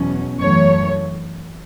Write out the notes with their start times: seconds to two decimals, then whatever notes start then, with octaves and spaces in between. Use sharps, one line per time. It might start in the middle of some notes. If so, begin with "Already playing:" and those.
Already playing: E2 B2 F#3 C#4
0.39 F#2 E3 A3 C#5